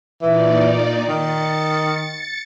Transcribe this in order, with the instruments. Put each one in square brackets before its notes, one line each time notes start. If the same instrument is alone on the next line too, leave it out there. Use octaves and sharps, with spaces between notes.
[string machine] A#2 D#4 D5 [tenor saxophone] E3
[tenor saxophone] D#3 [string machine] A6 C#7